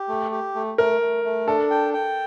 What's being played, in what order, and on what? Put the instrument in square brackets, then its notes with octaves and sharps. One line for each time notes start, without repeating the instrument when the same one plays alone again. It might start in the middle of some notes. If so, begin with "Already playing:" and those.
Already playing: [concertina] G4
A3
G4
A3
[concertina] A3 [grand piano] A#4
[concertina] A3
A3
[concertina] D4 [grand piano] A4
[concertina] G5
G5